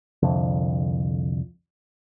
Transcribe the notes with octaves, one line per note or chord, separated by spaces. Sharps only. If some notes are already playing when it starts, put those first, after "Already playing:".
C2 F2 D3